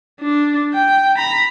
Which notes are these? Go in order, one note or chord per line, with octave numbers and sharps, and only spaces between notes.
D4
G5
A#5 B5